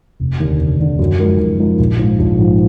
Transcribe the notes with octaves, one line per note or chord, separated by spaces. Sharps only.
F1
D#2 D3
F1
D#2 D3
F#2
F3 G#3 D#4 A#4
F#2
F3 G#3 D#4 A#4
A#1
G#2 F3
A#1
G#2 F3